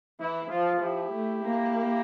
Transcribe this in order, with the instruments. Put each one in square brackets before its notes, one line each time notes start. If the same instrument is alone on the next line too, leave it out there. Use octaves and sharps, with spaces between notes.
[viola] E3 [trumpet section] E4
[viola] F3 [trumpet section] F4
[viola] F3 [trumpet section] E4 G4
[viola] A3
A#3